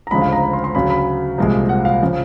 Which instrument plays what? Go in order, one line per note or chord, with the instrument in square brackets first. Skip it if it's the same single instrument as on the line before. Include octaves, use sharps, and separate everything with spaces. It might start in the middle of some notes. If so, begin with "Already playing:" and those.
[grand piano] A#5
D2 C#3 F3 G#3 B5
F5
A#5
B5
C6
C6
D2 C#3 F#3 B5
B5
C2 A#2 F3 G#3
F#5
F5
C#3 F3